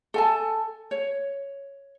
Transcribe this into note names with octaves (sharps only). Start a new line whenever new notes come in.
A4 G#5 A5
C#5